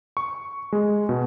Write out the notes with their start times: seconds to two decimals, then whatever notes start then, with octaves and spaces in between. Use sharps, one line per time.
0.17 C#6
0.72 G#3
1.09 B2